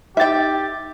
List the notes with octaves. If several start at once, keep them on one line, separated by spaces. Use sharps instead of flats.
D#4 G4 E5 G5 A6